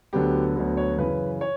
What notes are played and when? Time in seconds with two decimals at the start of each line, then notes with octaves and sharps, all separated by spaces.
0.13 D2 D3 F#3 B3 G4
0.55 D2 D3 F#3 B3
0.77 C#5
0.98 F#2 C#3 E3 B4
1.41 C#5